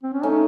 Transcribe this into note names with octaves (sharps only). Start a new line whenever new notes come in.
C4
C#4
A3 C#4 D#4